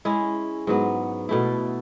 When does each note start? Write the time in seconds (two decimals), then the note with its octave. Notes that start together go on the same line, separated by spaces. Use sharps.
0.05 G#3 C#4 E4 G#4
0.67 G#2 F#3 B3
1.29 B2 A3 E4